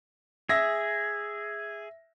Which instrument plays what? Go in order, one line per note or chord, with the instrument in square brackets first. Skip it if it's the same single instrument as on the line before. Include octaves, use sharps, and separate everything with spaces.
[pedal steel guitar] G#4 [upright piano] E5 A#6